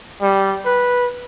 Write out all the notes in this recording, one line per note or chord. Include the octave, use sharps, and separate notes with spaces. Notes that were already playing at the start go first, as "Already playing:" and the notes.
G3
B4